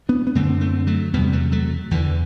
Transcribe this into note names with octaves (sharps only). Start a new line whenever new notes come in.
B3 D4
B3
F#2 D3 A3 C4
A3 C4
F#3 A3
E2 C3 G3 B3
F#3 A3
F#3 A3
E2 D3 E3